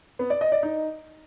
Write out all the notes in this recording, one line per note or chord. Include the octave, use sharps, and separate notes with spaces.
B3
D5
D#5
D5
D#4